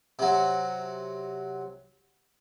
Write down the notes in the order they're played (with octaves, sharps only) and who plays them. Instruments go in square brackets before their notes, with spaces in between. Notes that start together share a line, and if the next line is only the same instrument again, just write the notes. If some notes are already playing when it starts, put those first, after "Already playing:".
[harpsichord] C3 F#3